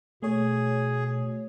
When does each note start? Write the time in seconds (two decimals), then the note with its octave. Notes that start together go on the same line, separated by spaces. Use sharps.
0.23 B2 A3 G#4 C#5